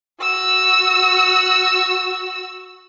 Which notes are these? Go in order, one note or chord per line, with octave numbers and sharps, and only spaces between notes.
F#4 E6